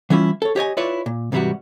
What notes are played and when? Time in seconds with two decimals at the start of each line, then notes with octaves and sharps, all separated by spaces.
0.10 E3 G3 C#4 E4 F4
0.42 A4 C#5
0.56 G4 C#5 D#5 G#5
0.77 E4 F4 B4 C#5 D5 E5
1.06 A#2
1.32 G#2 C3 E3 G3 E4 F#4